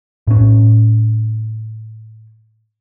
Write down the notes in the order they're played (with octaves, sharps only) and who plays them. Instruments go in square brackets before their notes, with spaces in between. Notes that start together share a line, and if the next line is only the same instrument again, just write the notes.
[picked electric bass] A2 C#4